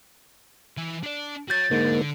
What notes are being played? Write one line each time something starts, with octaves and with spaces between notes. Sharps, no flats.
E3 E4
D4 D5
F#4 C#5 G6 A6
G#2 D3 A#3